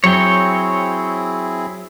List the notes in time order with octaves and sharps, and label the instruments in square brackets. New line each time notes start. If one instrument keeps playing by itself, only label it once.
[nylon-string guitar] F#3 [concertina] C4 E4 G#4 [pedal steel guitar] C#5 G5